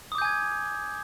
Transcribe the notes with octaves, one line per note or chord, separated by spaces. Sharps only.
G#5 D6 D#6 G6 G#6